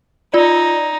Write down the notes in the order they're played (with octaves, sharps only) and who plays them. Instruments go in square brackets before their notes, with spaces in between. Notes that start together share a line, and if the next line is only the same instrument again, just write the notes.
[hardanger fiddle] D#4 [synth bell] F4 D5